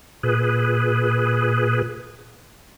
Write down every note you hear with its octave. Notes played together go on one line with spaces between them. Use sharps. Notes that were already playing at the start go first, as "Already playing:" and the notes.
A#2 G#4 B4